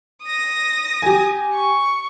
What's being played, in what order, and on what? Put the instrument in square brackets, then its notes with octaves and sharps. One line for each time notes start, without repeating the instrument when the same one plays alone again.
[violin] D#6 A#6
[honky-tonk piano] G4 G#5
[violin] C#6